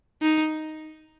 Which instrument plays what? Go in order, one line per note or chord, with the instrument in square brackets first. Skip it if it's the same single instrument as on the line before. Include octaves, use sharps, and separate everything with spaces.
[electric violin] D#4